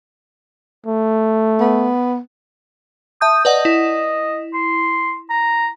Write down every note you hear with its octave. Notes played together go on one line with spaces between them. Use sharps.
A3
B3
E5 A5 D#6 G6
B4 D5 D#5 F#5
E4
C6
A#5